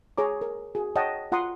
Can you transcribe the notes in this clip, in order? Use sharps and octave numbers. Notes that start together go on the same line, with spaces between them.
G#4 C#5 A#5 D6
A#4
F#4 G#4
C#5 D#5 F#5 G5 A5
F4 F#5 A#5 C6 D#6